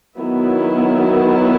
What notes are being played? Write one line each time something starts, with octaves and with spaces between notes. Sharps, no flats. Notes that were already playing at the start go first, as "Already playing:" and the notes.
D#3 F#3 B3 E4